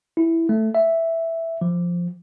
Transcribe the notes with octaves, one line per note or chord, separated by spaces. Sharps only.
E4
A3
E5
F3